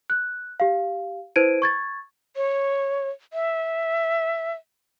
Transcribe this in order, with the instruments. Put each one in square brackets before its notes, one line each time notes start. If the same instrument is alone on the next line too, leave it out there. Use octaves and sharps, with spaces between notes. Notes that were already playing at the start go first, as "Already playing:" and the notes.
[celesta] F#6
G4 F5
E4 B4 C5 G#6 D7 D#7
C#6 G#6 A6
[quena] C#5
E5